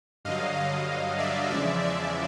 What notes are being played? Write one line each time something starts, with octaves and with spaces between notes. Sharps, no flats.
G2 D3 F#3 D#5 F5
D#5 F5
D5 E5
E2 C#3 F3 G#3 D5 E5
D5 E5